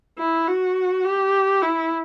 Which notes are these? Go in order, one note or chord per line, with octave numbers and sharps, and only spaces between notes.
E4
F#4
G4
E4